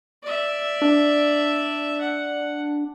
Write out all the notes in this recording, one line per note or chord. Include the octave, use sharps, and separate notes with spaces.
D5 E5
D4
F#5